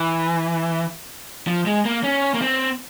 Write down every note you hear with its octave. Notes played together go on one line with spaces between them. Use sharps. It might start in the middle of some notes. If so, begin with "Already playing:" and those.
Already playing: E3
F3
G#3
A#3
C#4
A#3
C4